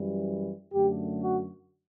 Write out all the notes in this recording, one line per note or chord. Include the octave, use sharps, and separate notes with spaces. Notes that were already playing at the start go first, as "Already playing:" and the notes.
Already playing: F#2 E3 G3
F#2 D3 A3 G4
F#4